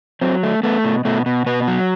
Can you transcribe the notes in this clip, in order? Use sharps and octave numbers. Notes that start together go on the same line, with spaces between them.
F#3 C4
A3
A3 B3
B2
B2 A3
B2
B2 B3
F#3